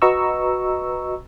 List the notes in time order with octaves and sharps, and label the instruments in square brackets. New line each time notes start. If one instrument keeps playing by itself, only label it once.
[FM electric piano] F#4 B4 D#5 A#5 C#6 E6